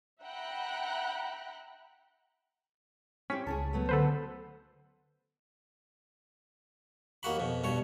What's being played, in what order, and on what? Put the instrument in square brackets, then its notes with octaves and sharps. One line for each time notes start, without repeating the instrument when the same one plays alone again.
[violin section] E5 F#5 G5 A#5 B5 F#6
[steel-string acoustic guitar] C4 E4 G4 [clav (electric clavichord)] C#4 [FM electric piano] B6
[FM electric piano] C#2 A5 [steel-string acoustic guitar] G#4 A4 C#5
[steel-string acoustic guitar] F#3 A3 B3
[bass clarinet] D3 [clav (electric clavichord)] A4 B4 C5
[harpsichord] D#2 A#3 F#4 B5
F2 B2
G2 B2 C#5